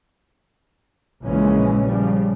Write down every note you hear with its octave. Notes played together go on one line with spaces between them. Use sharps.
A#1 C#3 E3 G#3 C#4
C#3 F3 G3